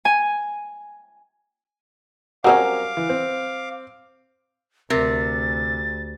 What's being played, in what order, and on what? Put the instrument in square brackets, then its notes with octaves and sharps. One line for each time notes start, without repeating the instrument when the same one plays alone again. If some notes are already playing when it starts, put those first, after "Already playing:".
[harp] G#5
[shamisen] F#3 G3 C#4 [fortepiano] C4 A#4 [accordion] F5 D6 [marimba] F#5
[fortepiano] E3
C4
[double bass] D2 [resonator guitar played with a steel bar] C3 [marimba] A#4 [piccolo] A6